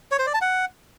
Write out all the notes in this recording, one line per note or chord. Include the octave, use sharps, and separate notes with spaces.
C#5
C5
D5
A5
F#5